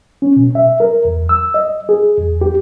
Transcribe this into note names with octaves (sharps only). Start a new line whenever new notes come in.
C#4
B2
E5
A#4
E2
E6
D#5
G#4
E2
G4